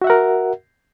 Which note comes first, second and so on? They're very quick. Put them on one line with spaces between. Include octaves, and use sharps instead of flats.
F#4 E5 F#5 A#4